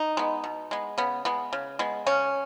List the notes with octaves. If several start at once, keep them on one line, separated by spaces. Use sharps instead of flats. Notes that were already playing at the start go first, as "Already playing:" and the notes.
Already playing: D#4
G#3 B3
B2
G#3 B3
C#3 B3
G#3 B3
C#3
G#3 B3
C#3 C#4